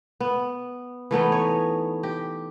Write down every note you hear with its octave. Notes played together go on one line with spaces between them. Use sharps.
B3
E3 A3 B3 D#4
C#5
G4